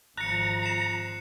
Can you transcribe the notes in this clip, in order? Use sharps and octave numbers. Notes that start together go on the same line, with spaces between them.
G#1 F3 A#5 F#6 C#7
C7 E7